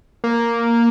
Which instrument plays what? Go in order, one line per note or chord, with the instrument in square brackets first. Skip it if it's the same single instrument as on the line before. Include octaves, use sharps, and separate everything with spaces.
[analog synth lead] A#3